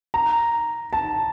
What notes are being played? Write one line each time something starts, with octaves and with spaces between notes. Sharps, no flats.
A#5
A5